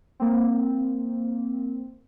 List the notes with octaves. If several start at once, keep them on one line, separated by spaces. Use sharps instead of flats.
A#3 C4